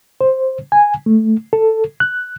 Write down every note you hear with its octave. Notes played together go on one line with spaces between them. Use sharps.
C5
G#5
A3
A4
F#6